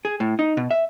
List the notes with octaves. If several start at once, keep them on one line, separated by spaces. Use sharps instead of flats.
G#4
A2
D#4
B2
E5